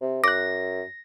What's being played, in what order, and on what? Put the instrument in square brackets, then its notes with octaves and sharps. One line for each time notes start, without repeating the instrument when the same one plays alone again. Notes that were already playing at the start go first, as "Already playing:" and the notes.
[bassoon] C3
[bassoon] F#2 [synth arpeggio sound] D6 F#6 [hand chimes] A#6